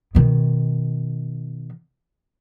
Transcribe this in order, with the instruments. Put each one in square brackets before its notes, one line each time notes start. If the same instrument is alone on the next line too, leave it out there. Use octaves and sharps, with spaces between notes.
[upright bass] B2 D#3